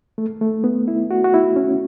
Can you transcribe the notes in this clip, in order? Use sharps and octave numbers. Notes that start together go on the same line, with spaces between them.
A3
A3
B3
E4
F#4
F#4
E4
C#4